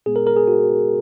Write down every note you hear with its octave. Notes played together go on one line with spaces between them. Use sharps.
A#2 G#3 B3 G#4
A#4
A#4
G#4
F#4